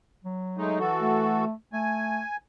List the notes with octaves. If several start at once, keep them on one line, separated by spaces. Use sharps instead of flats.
F#3
G#3 A3 D#4
E3 F#4 A4
A3
A3 G#5